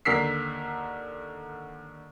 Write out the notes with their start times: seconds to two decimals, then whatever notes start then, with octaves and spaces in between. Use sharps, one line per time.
0.05 D#2 D3 A#4 E6 B6 C7